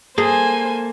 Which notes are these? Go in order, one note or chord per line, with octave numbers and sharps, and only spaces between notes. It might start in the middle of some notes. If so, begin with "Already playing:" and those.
A#3 G#4 A4 C5 G#5